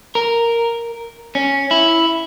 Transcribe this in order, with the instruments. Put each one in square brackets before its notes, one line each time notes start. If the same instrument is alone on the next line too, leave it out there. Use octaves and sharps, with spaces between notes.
[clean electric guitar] A#4
C#4
E4